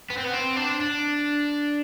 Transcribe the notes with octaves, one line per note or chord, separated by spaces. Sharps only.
B3
C4
B3
C4
D4
D4